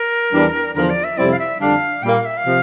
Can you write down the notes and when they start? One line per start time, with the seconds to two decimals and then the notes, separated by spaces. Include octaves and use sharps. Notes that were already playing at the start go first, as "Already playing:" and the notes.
Already playing: A#4
0.33 E2 E3 G3 D4
0.75 E2 D3 F3 A#4
0.90 D5
1.04 E5
1.17 F2 C3 G3 C4 E4 D5
1.32 F5
1.39 E5
1.60 F2 D3 G3 D4 F5
2.03 A#2 G3 A#3 G5
2.15 F5
2.25 E5
2.37 F5
2.46 C3 F3